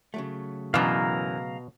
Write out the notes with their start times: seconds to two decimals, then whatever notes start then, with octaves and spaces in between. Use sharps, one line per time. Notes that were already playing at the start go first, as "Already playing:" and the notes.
0.14 C#3 F#3 A3
0.74 F#2 B2 E3 D5 F5 A#5